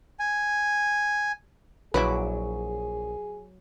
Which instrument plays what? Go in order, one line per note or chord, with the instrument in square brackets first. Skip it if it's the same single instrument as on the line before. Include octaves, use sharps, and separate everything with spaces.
[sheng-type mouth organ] G#5
[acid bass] A#1 [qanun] F#3 D6 [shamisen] E4 B4 [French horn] G#4